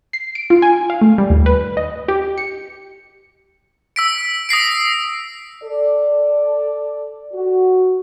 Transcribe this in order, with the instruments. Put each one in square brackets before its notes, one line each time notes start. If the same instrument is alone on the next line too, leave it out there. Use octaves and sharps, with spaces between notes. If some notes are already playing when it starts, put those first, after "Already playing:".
[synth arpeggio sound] C7
D7
F4
G#5
F5
A3
G3
D#2
B4
D#5
G4
C#7
[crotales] E6 B6 D7
D#6 A#6 C7 D7
[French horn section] A4 D5
F#4